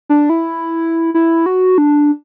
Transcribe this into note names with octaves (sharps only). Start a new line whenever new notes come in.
D4
E4
E4
F#4
D4